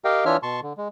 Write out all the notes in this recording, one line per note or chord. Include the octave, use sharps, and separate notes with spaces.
G4 A#4 D#5 F5 G5
E3 D4 F4 C#5 E5 F6
B2 A5 C6 C#6
D3
G#3